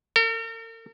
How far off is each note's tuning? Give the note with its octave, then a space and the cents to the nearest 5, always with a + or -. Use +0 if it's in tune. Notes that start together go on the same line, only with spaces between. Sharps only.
A#4 -45